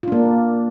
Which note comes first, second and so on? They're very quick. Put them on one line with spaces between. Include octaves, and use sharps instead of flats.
F4 D4 A#3